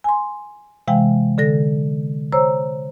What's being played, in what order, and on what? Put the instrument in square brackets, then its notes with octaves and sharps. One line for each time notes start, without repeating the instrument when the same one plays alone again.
[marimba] G#5 C6
C3 E3 G#3 F5 G5
D3 A4 A#6
C5 C#5 A#5 E6